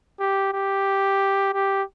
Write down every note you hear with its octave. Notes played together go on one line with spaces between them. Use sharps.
G4
G4
G4